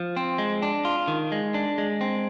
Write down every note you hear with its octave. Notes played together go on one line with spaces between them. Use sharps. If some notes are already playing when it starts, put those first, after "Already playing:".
Already playing: F3
C4
G#3
D4
F4
D#3
G#3
D4
G#3
C4